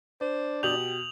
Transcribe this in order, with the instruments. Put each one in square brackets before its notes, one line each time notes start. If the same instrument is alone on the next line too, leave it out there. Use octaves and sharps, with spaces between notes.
[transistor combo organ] D4 D5 [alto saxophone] C5
[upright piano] B2 D#6 G6 [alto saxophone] G4 [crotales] F7 F#7